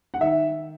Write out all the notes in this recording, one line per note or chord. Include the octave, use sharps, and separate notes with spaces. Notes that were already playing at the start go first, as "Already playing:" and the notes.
F#5
D#3 E5